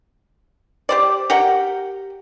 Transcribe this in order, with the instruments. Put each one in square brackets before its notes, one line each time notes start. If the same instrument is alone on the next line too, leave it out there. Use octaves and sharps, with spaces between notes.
[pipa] G4 C5 D5
G4 A#4 F#5 G5